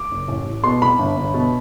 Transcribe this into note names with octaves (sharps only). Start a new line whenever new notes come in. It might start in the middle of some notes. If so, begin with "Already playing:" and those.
Already playing: D6
F#1
A1
A1
B2 C6
C2 B5
G1
G1
B2